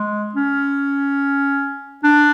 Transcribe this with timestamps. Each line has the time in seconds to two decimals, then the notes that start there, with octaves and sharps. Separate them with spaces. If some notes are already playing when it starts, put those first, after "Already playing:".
Already playing: G#3
0.35 C#4
2.04 D4